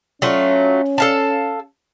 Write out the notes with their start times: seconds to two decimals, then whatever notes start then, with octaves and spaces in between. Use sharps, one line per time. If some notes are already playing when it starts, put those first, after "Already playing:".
0.22 F#3 A3 C#4 F4
0.98 A4 F5 A5